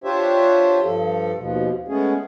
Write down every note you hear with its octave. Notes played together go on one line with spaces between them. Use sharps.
D4 F4 G4 C5 C#5 E5
G2 F3 A4
D#2 B2 F3
G#3 A3 B3 C#4 G#4